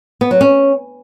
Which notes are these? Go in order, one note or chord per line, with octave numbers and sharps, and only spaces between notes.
B3
F#3
C#4